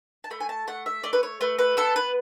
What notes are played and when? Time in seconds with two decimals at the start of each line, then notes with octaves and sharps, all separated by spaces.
0.24 A5
0.31 A3 B5
0.40 G#5
0.49 A5
0.67 A3 F#5
0.86 E5
1.04 A3 D5
1.13 B4
1.23 C#5
1.41 A3 B4
1.59 B4
1.77 B3 A4
1.96 B4